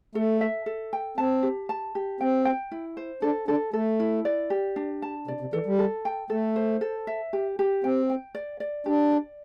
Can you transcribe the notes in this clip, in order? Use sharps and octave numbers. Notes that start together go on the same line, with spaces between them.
A3 A4
E5
A4
G5
C4 A5
G4
A5
G4
C4 G5
G5
E4
C5
D4 A4
D4 A4
A3 A4
E4
D5
G4
D4
A5
C3 D5
C3
E3 A4
G3
A4
G5
A3 A4
C5
A4
E5
G4
G4
C4 G5
G5
D5
D5
D4 G4
D5